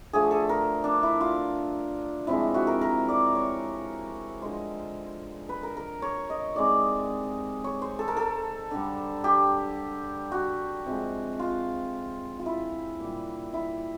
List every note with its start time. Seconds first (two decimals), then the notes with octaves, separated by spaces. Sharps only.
0.13 D3 F3 A3 G#4
0.31 A4
0.49 A#4
0.84 D4
1.03 E4
1.21 F4
2.27 C3 F3 G#3 E4
2.54 F#4
2.67 A#4
2.81 A#4
3.09 D5
3.35 C#5
4.42 D3 F3 G#3 C5
5.49 B4
5.63 A#4
5.77 A#4
6.02 C#5
6.30 D#5
6.56 C3 D#3 G#3 D5
7.64 C#5
7.82 C5
7.99 A4
8.08 A#4
8.17 A4
8.71 D3 G3
9.24 G4
10.32 F#4
10.86 C3 F3 G#3
11.39 F4
12.39 F4
12.46 E4
13.00 A#2 G3
13.54 E4